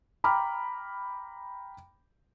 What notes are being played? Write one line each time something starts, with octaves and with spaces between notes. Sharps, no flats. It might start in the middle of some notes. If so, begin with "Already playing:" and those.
G5 A#5 B5 D6 F6